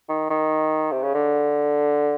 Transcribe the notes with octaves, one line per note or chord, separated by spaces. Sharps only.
D#3
D#3
C3
C#3
D3